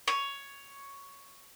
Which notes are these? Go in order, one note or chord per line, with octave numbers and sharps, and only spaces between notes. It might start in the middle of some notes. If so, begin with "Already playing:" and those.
C#5